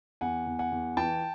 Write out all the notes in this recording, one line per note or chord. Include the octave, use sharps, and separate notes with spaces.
E2 F#5 G#5
E2
F#5 G#5
E2
E3 G5 A5